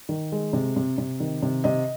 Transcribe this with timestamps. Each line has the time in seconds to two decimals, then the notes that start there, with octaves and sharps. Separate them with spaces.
0.09 D#3
0.32 G#3
0.53 C3
0.76 C3
0.98 C3
1.20 D#3
1.42 C3
1.64 C3 D#5